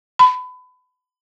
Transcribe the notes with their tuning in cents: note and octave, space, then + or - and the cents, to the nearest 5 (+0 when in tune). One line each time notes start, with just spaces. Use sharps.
B5 +25